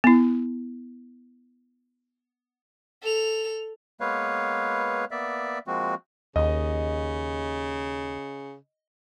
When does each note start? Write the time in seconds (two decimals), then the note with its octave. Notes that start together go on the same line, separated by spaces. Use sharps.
0.04 B3 E4
3.02 A4 F7
4.01 G#3 A#3 B3 B4 C#5 F5
5.11 A#3 B3 D5 E5
5.67 F3 G#3 A#3 C4 F#4
6.36 D#2 C#3 D#5